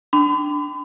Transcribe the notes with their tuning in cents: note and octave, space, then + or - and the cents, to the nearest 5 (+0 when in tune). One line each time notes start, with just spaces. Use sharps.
D4 +0 B5 +45 D6 +0